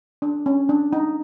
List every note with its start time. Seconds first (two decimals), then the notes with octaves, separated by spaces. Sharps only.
0.22 D4
0.46 C#4
0.69 D4
0.93 D#4